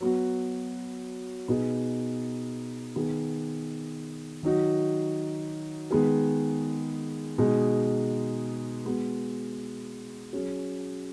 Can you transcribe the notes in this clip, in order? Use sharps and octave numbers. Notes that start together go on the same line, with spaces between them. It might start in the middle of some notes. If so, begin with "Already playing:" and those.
F#3 B3 F#4
B2 B3 D#4 G#4
D#3 B3 G#4
D#3 F#3 D#4 F#4
D#3 G#3 B3 G#4
B2 G#3 D#4 G#4
G#3 B3 F#4
F#3 C#4 G#4